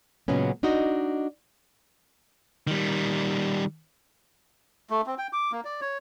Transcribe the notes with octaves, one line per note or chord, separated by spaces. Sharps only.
A#2 C#3 F#3 G#3 B3 C#4
D4 D#4 F#4 D#5
D#3 G3
A3
C4
G5
D6
A#3
D5
C#5